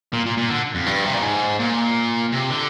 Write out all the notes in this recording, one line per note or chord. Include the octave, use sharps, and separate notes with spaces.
A#2
A#2
A#2
D3
F2
G2
C3
A#2
G#2
A#2
C3
D3